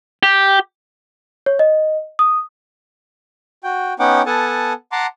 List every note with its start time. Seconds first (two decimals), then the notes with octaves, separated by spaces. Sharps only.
0.23 G4
1.46 C#5
1.59 D#5
2.19 D#6
3.64 F#4 G5
4.00 B3 C#4 D#4 F#5 G5 D6
4.26 B3 A4 F#5 G#5 A5
4.92 F#5 A5 A#5 C6 D6